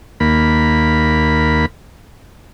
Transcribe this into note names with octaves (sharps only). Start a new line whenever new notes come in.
D#2 A#3 B5